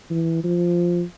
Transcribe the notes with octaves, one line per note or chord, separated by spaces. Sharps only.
E3
F3